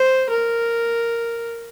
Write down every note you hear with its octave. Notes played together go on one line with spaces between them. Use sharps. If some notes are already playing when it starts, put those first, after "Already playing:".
Already playing: C5
A#4